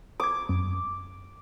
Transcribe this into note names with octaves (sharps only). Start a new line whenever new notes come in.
D6 D#6 G#6
F#2